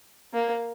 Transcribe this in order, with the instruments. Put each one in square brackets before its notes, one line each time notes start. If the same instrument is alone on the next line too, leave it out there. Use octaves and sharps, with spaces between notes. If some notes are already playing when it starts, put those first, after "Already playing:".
[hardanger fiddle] A#3